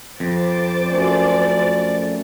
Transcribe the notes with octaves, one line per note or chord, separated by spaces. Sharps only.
F2 C5 D6 A6
F#2 A3 C#4 D5